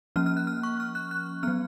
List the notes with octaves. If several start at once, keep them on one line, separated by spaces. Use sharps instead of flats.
F3 A#3 C#4 F6
F6
F#6
F6
C#6
F6
F#6
F#6
F#3 B3 F6